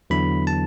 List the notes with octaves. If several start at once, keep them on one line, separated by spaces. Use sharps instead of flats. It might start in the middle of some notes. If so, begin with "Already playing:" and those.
E2 D3 F#3 B3 E4 B5
A5